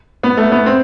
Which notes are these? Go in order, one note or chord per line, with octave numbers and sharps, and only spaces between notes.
B3
A3
B3
C4